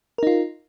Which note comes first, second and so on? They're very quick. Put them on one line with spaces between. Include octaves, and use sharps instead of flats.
A#4 D#4 F4